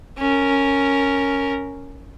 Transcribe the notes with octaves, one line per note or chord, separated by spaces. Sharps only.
C#4 A#4